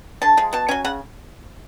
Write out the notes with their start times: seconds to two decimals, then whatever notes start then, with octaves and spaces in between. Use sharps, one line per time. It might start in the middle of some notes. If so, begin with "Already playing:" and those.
0.22 D3 A5
0.37 F3 G#3
0.53 B2 A5
0.68 F#3 C#4 G#5
0.85 C#3 F#5